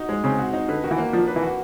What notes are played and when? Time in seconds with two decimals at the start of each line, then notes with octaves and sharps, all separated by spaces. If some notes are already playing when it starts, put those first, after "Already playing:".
Already playing: D#4 F#4
0.09 G#3
0.24 C#3 C4
0.39 F#4
0.53 D#4
0.69 D3 B4
0.84 D#3 F#4
0.91 E3
0.98 A#3
1.13 F3 D4
1.27 B4
1.36 E3
1.43 F#4